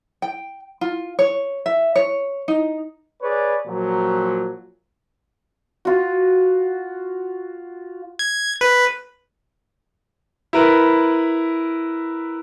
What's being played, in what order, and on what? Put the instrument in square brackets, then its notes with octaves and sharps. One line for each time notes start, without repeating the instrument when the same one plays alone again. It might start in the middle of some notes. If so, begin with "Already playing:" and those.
[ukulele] G5
F4
C#5
E5
C#5
D#4
[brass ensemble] G#4 B4 C#5 D5
A#2 F3 F#3
[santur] F4 F#4
[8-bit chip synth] G#6
B4
[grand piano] E4 A#4 B4